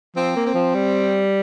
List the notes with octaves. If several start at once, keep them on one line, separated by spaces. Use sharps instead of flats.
F3 C4
A#3
C4
F3
G3